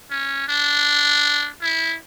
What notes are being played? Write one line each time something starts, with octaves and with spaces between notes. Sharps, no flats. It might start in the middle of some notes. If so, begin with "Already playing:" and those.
C#4
D4
E4